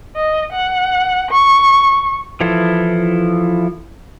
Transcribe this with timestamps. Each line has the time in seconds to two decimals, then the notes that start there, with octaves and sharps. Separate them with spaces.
0.16 D#5
0.53 F#5
1.31 C#6
2.41 E3 F3 E4 A4